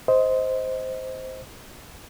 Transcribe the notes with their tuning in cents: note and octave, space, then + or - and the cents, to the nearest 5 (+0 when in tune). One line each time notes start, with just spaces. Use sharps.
C5 -5 D#5 +20